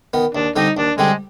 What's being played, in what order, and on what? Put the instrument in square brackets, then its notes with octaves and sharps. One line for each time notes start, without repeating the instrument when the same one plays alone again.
[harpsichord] D#3 B3
[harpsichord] D#2 [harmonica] D4
[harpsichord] D3 G3 C4 G4 [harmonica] D#4
[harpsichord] D#2 [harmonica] D4
[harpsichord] D3 G3 C4 G4 [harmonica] G#3